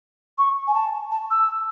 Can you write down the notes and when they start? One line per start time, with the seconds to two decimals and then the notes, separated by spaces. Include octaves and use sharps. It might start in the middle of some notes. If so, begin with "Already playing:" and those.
0.38 C#6
0.67 G#5
0.74 A5
1.11 A5
1.30 E6